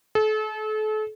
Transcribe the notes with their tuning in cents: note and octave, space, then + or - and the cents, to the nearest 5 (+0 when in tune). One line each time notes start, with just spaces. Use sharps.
A4 -35